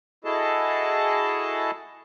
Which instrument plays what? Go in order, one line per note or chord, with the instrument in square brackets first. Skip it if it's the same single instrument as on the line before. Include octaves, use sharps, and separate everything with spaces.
[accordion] E4 F#4 G#4 A4 D#5 A5